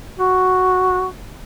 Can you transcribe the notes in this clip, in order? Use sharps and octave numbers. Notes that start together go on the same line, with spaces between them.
F#4